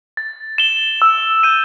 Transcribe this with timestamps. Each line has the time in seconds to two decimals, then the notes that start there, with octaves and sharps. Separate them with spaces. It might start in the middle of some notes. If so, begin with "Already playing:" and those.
0.17 A6
0.58 E7 G7
1.02 E6
1.43 G6 D#7